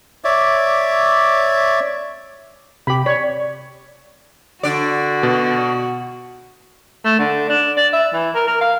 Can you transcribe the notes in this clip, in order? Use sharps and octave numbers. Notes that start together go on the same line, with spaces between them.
C#5 D5 E5 D6
C3 G4 B5
C#5 D5 B6
D3 F#4 D5
B2
A3
D3
D4
D5
E5
E3
A#4
A#4
F5